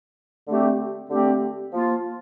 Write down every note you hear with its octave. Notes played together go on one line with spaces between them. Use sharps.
D3 A3 C4 G4
D3 A3 C4 G4
F3 A#3 F4